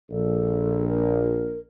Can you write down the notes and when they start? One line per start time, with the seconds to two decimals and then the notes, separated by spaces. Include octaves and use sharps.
0.11 A#1 A4
0.88 A#4